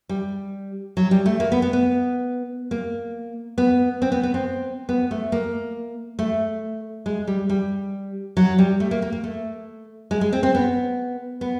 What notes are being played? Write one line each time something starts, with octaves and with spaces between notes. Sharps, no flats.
G3
F#3
G3
A3
A#3
B3
B3
B3
A#3
B3
C4
B3
B3
C4
B3
A3
A#3
A3
G#3
G3
G3
F#3
G3
A3
A#3
A#3
A#3
A3
G#3
G#3
C4
C4
B3
B3